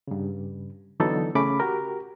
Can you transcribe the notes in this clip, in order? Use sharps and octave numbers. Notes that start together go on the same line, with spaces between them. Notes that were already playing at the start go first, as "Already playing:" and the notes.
G2 C#3
D3 E3 F#3 B3 D#4 A4
C#3 A3 C#4 B5 D6
F#4 G4 A#4